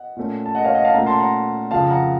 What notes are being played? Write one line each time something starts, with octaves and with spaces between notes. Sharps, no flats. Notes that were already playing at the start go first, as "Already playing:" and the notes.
Already playing: D#5 F#5
A#2 A3 C#4
A5
D#5 F#5
C#5 F5
D#5 F#5
F5 A5
A#2 A3 C#4 F#5 A#5
A5 C6
F#5 A#5
F2 C#3 F3 F5 A5
F#5 A#5